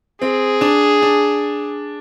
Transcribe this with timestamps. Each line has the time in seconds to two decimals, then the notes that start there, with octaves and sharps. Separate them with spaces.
0.22 C4 G#4
0.61 D4
1.02 D4